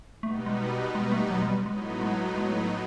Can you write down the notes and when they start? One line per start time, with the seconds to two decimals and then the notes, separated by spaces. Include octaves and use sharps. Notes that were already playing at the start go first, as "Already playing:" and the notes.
0.23 B2 G3 A3 B3 D#4
0.46 G#3
0.95 G#3
1.12 A3
1.30 F#3
1.42 G#3
1.48 G3
1.66 A2 F#3 G#3 B3 D#4
2.02 G#3
2.38 G#3